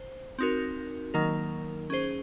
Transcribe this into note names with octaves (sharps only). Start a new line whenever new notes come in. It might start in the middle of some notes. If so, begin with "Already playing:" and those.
Already playing: C5
C4 D#4 F#4 A#4
D#3 F#3 A#3 D#4 A#4
C#4 G#4 C5